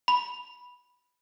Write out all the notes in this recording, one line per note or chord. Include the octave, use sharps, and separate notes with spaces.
B5